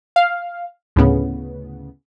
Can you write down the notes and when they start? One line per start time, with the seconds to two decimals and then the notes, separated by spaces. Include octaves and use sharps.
0.16 F5
0.96 D2 A2 C#3 B3